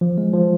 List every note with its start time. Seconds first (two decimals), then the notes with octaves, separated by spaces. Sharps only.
0.01 F3
0.18 G#3
0.34 F3